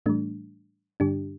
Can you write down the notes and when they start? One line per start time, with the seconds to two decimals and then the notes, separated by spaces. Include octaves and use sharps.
0.06 A2 E3 G3 A3 D4
1.00 G2 D3 G3 D4 G4